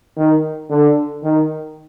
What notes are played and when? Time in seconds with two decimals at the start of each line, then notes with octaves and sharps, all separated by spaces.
0.17 D#3
0.70 D3
1.23 D#3